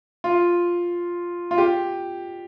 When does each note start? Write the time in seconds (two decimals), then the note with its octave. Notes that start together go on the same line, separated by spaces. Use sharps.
0.24 F4
1.51 F4
1.58 G4